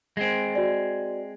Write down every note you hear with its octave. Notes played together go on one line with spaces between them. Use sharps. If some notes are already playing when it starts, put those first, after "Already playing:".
G#3 C4
F#4 D5